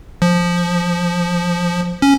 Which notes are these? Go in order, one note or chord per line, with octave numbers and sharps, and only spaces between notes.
F3
C#4